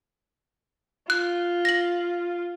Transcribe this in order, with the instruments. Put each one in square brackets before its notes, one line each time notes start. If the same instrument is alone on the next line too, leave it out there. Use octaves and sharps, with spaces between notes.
[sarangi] F4 [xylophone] F#6
[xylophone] A#6 F#7